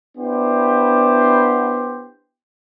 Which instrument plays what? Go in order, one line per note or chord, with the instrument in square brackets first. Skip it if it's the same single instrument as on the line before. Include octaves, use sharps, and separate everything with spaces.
[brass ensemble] B3 D4 E4 G4 C5